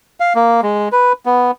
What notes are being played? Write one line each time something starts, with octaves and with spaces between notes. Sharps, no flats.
F5
A#3
G#3
B4
B3